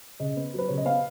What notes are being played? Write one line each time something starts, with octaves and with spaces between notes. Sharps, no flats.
C#3 D#5
B3
F#3 B4
C#3 C#5
D#5
B3 F5